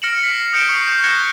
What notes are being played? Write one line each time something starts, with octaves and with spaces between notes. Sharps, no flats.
F6 A#6 C#7 D7 E7 F#7
B6 C7
D#6 G6 C#7 D7 E7 G7
C#6 D#6 C7
G6 C7
F#6 G#6 A#6 C#7 E7 G7